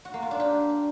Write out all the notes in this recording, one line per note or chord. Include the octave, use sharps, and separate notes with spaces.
F#4
A#3
F4
D4
G4